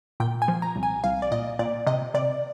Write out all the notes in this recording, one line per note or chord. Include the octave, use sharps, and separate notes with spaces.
A#2 G5
G#5
F3
A#5
C2
G#5
C2 F5
D5
A#2 D#5
A#2 D5
C3 D#5
C3 D5